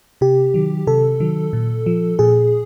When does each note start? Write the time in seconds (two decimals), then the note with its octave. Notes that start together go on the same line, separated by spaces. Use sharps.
0.21 C3 G4
0.54 D#3 F#3
0.87 C3 A4
1.20 D#3 F#3
1.53 A#2
1.86 F3
2.19 A#2 G#4